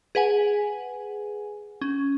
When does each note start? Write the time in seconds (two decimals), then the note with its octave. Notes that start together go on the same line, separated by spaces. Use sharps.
0.15 G#4 B4 F#5 G#5
1.81 C#4